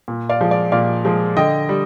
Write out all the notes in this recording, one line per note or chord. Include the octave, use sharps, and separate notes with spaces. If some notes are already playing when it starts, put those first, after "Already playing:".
A#2
D5 F5
F3 G#3
D5
A#2 D5 F5
F3 G#3
D3 D#5 G5
G3